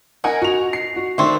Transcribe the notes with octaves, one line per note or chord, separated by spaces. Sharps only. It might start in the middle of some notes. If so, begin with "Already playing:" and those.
D#4 A#4 F#5 G#5
F#4 F7
C7
F#4
D#3 A3 C4 D4